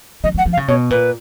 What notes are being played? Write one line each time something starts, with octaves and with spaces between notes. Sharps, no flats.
F#3 D#5
F#3 F#5
F3
F5
C#3
B2 C#5
A#2 B4